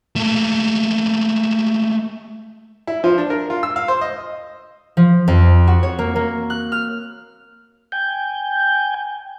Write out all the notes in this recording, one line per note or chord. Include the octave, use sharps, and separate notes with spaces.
A3 A#3
E4
F3
D4
A#4
F4
E6
F5
C5
D#5
F3
F2
F#4
C#5
A#3
A#3
F#6
F6
G5 G#5 G6